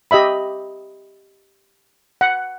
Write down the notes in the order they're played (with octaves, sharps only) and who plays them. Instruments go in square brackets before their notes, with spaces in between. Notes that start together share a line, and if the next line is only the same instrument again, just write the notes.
[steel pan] G4 D#5 E5 B5
F#5